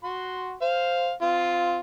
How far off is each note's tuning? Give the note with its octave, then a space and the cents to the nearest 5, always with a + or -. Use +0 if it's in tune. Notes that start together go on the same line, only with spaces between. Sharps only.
F#4 +0 C6 +0
C5 +0 F5 +0
C4 -25 F4 +0